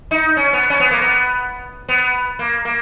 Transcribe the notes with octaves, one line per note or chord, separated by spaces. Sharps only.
D#4
C#4
B3
C#4
B3
A#3
B3
B3
A#3
A#3